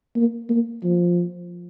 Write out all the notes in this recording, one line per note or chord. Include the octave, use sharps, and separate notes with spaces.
A#3
A#3
F3